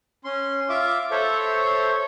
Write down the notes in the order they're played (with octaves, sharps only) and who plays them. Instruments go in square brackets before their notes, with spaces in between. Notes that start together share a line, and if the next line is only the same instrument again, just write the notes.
[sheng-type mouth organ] C#4 C6
F4 E5 D6
A4 C5 C#5 E5